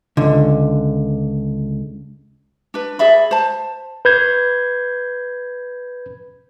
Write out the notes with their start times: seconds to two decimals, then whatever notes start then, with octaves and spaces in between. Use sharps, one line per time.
0.17 C#2 D3
2.74 D4 B4
2.99 G#4 D5 E5 B5
3.31 C5 A5
4.05 B4 G6 G#6